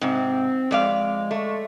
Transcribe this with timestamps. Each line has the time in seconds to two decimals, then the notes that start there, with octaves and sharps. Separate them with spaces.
0.01 G#2 C3 C4
0.71 F2 G#3 D5 F5
1.31 A3